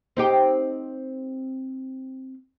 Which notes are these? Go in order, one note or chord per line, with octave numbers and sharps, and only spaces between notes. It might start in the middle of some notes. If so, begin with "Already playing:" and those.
C4 D#4 G4